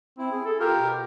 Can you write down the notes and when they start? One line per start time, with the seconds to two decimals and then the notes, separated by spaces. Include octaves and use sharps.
0.18 C4 E4
0.32 G#4
0.45 A4
0.60 F4 G4 A#4
0.79 B2